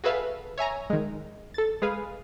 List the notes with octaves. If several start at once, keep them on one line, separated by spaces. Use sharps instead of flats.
F#4 G#4 A4 B4 E5 F5
C#5 E5 G#5 A#5
D#3 G#3
A4 A6
G#3 G#4 B4 F5